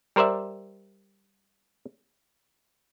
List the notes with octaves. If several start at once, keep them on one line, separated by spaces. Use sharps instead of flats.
G3 A#4 C5 D5 E5